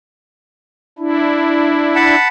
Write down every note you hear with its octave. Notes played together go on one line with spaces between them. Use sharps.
D4 E4
F#5 A5 B5